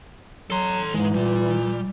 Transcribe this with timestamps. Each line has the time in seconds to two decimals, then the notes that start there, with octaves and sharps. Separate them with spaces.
0.50 F#3 A4 C6
0.94 G#2 E3 G#3
1.14 A#2 G3